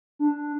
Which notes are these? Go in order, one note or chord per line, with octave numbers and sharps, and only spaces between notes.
D4